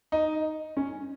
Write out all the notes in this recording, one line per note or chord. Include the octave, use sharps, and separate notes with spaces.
D#4
C#4